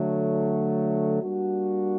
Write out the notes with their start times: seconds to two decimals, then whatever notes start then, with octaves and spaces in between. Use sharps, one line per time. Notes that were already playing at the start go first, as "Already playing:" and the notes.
Already playing: D3 F#3 A3
1.22 G3 A#3 D4 F#4